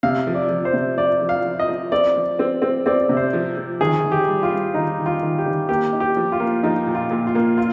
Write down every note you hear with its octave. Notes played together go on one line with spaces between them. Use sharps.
C3 F5
F3
D5
F3
C5
C3
F3 D5
F3
F5
F3
D#5
F3
C4 D5
F3
C4
C4
C4 D5
C3
C5
F3
F3
D#3 G#4
D#3
G4
G3
F4
G3
D#3 D#4
D#3
F4
D#3
G4
D#3
A#3 G4
D#4
G4
F3
F4
A#3
F3 D#4
A#2
F4
A#2
F4
A#3
F4